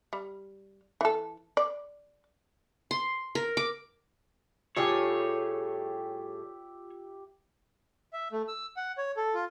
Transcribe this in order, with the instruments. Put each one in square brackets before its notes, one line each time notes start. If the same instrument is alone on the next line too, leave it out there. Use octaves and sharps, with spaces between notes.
[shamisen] G3
E3 A4
D5
[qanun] C6
A#4
D6
[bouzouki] A2 G3 G#4 [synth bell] F4 [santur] G4 E5 [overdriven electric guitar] C#5
[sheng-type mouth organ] E5
A3
E6
F#5
C#5
A4
F4